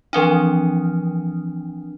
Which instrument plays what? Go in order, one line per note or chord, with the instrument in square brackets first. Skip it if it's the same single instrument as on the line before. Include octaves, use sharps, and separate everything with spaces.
[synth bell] E3 F3 C4 D4